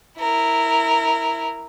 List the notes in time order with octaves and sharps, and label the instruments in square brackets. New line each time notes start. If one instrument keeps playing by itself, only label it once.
[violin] E4 A#4